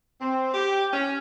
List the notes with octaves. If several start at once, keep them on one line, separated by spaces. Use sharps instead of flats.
C4
G4
C#4